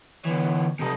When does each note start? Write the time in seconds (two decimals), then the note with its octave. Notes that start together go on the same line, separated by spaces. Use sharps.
0.25 D3 E3 B3 C#5
0.79 G2 C3 G3 D#4 A4